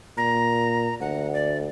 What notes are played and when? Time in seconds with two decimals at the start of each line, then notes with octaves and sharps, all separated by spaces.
0.17 A#2 A#5
1.00 D2 F#5
1.34 D5